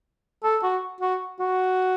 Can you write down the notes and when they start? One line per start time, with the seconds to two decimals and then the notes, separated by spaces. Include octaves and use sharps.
0.44 A4
0.63 F#4
1.01 F#4
1.40 F#4